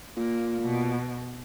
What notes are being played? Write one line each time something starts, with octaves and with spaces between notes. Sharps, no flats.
A#2 A#3
B2